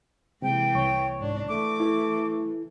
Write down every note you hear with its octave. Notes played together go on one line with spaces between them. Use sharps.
C3 E3 G#3 A#3 G5
C2 C#5 C#6
G#2 D4
E3 A3 D6
E4 A4